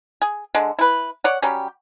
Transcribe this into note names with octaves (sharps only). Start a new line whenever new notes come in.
G#4
D3 G#3
E4 B4
C#5 D5 F#5
F#3 G3 C#4 G4